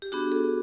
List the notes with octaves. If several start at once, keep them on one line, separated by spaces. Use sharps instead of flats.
G4
B3 D4 F#4 G#4
A4